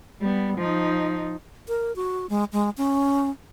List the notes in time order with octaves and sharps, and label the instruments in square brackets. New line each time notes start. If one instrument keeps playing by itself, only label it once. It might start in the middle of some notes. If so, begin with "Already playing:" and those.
[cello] G3 B3
F3 D#4
[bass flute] A#4
F#4
G#3
G#3
C#4